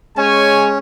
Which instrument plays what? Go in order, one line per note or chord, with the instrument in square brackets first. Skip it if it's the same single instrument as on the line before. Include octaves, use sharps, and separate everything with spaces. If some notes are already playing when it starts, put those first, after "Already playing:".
[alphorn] G#3 [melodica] C#4 [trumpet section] C#5 G#5